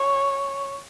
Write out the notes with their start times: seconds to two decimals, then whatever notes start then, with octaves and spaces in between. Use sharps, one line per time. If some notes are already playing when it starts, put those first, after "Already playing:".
Already playing: C#5